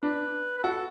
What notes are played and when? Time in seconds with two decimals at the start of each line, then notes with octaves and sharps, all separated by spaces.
0.03 D4 B4
0.59 B4
0.63 F#4 A4